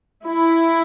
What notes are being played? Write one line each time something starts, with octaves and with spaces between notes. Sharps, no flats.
E4